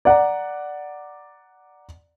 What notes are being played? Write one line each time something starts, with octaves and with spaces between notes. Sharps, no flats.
D5 F#5 A#5